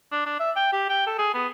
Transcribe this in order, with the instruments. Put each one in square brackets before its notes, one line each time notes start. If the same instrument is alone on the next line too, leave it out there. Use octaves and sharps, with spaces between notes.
[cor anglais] D4
D4
E5
G5
G4
G5
A4
G#4
B3